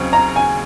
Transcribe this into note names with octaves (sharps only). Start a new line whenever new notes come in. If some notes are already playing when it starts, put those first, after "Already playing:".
Already playing: D#2 C#3 F#3 C4
A#5
G#5